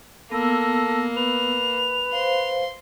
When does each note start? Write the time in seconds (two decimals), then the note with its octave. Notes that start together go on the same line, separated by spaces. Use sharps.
0.32 A#3 B3 A4 E6 A#6
1.16 B4 F7
2.12 C5 F5 C6